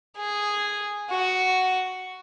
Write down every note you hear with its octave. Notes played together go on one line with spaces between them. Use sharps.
G#4
F#4